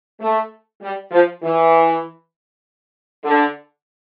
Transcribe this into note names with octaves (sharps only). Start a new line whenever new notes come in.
A3
G3
F3
E3
D3